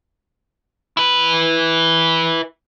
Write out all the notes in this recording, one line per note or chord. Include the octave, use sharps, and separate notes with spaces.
E4 B4